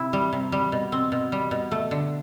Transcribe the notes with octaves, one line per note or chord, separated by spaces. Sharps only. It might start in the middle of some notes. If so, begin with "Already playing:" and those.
Already playing: C3 C4 E4
G3
C3
G3
B2
C4
B2
G3
B2
A3
D3